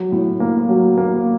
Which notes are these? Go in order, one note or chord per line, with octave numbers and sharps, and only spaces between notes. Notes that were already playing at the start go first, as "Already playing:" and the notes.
Already playing: F#3
A2
A#3
F#3
A#3